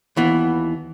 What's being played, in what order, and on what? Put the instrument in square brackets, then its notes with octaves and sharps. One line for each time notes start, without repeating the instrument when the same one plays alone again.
[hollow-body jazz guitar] D#2 E3 B3